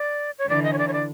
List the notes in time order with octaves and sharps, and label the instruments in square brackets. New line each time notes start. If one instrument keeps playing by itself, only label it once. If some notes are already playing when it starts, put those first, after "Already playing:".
Already playing: [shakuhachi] D5
C#5
[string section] D3 E3 [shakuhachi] D5
[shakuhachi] D#5
C#5
D5
C#5
D5